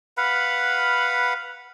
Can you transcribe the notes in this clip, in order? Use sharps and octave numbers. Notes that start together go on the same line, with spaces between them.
B4 F5 F#5 B5